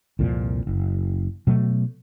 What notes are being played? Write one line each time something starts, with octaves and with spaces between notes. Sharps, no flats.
C2 F2 A#2 F3
F#1
B2 F#3 A3 B3